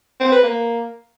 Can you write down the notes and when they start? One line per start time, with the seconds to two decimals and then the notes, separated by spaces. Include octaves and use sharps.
0.20 C4
0.32 B4
0.43 A#3